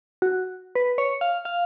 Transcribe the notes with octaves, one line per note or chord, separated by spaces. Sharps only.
F#4
B4
C#5
F5
F5